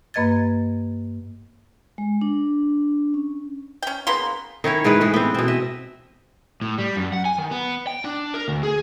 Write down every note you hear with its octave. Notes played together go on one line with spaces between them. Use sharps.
G2 A#3 B4 D#5 G#6 A6
G#3
D4
C#4
C#4 G5
C#3 A#3 B3 C6
D#3 C#4 E4 C#5
G#2 E3 G#3 B4
A2 E3 G#3
B3 C4
B2 C4
D#5 E5
A2
G3
F#2
F#5
G#5
D#3
B3
G5
D4
A#4
D2
G#4